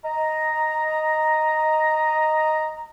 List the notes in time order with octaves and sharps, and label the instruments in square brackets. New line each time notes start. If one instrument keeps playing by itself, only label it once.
[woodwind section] D#5 A#5